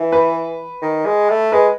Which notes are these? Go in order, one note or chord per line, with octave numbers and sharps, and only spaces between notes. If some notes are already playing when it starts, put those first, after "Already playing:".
Already playing: E3
B4
D#3
G#3
A3
G#3 B4